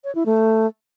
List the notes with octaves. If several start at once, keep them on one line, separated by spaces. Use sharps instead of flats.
C#5
E4
A3